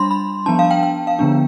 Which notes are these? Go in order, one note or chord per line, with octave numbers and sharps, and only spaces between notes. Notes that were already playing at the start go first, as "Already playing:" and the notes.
Already playing: G3 D4 B5 C6
B5
F3 B3 D4 A5
F5
G5
G5
F5
D3 F3 B3 D4